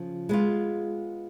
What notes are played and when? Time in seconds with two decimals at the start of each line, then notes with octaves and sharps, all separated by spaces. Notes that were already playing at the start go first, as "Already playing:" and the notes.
Already playing: C#3 F3
0.29 G#3 B3 F4